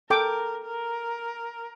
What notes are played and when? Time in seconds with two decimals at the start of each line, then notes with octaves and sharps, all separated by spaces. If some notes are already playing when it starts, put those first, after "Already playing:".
0.10 A4 A#4 G5 D6
0.65 A#4